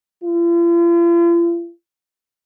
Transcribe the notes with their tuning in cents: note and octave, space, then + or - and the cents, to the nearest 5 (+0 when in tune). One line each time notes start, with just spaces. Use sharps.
F4 -45